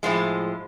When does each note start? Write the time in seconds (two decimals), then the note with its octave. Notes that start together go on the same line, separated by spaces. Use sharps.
0.03 A2 F3 G#3